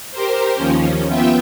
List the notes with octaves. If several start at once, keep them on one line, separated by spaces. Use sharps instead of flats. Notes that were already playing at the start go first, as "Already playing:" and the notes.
G4 A#4 C5
D#2 F3 C#4
B3 F4 E5 G5